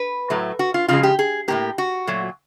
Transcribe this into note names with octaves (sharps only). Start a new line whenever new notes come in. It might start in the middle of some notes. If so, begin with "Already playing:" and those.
Already playing: B4
A2 F#3 A3
F#4
F4
C#3 F3 G#3 F4
G4
G#4
A2 F3 A#3 G4
F#4
A#2 F#3 A3